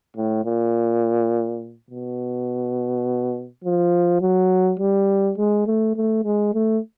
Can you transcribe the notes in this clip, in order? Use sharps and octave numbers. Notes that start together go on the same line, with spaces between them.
A2
A#2
B2
F3
F#3
G3
G#3
A3
A3
G#3
A3